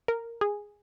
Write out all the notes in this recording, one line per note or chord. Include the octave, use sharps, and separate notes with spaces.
A#4
G#4